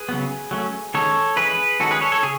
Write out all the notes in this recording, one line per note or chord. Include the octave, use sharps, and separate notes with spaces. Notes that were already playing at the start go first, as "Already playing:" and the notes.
Already playing: G#4 B4
C#3 F#3 B3
F#3 A3 C#4
D#3 G#3 C#4 A4 C#5
E3 G#3 C#4 G#4 B4
D#3 G#3 C#4 F#4 A4
G#4 B4
A4 C#5
A4 C#5
C#3 G#4